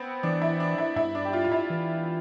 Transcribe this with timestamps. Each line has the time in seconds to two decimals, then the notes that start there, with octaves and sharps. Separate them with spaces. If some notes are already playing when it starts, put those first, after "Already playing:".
Already playing: B3 C4
0.23 E3 D4
0.42 E4
0.60 D4
0.78 E4
0.96 G2 E4
1.15 D4
1.25 G4
1.33 F4
1.44 F4
1.52 E4
1.70 E3